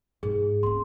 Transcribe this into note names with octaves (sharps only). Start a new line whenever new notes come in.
G#2 G#4
A#3 C#4 C6